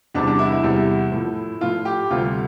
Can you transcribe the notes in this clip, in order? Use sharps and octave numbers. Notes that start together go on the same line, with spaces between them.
E2 C3 G3 D4
D4
E4
E4
E2 C3 G3
A2 F3
A2 F3 F4
G4
D2 C3 G3 F4